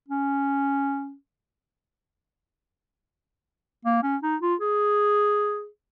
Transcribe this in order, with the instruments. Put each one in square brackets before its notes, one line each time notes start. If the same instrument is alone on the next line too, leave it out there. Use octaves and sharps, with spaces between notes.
[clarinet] C#4
A#3
C#4
D#4
F4
G#4